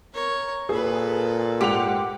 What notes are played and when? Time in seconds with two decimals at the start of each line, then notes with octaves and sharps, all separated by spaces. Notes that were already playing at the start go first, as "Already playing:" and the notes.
0.13 A#4 C#5
0.69 A#2 G#4 A4 B4
1.61 G#2 G4 F#5 F7